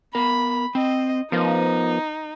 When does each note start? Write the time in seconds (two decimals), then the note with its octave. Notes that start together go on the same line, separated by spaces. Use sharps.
0.15 B3 A#4 B5
0.75 C4 D#5
1.32 F3 B3 D#4 A#4 B4